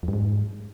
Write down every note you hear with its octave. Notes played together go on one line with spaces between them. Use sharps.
F2
G2
G#2